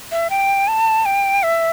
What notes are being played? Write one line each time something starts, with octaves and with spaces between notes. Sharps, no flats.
E5
G5
A5
G5
E5